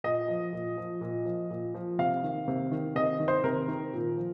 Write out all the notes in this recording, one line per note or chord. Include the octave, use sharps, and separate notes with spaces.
A#2 D#5
F3
A#2
F3
A#2
F3
A#2
F3
C3 F5
D#3
C3
D#3
C3 D#5
D#3
C5
C3 A#4
D#3
A#2
F3